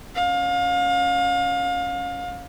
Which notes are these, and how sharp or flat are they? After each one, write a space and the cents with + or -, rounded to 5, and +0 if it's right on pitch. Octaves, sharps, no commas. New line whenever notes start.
C#4 +0 F5 +30